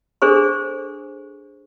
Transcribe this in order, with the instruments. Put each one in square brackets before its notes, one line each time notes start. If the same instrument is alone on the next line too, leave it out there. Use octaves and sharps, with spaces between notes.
[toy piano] D4 G#4 A4 C5 C#6